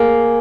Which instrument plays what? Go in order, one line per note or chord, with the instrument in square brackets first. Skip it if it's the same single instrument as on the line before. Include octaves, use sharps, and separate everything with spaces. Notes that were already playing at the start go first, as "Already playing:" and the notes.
Already playing: [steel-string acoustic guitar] A#3 G#4